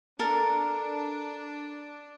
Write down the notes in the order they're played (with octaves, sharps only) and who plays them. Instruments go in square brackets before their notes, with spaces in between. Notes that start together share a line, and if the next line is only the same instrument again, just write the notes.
[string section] D4 [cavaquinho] A4 A#4